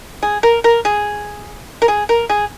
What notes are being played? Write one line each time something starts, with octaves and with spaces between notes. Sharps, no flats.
G#4
A#4
A#4
G#4
A#4
G#4
A#4
G#4